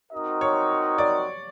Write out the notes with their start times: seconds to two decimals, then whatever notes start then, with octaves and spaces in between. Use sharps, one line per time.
0.12 C4 D#4 F#4 A#4 D#5
0.41 C#5
0.98 D5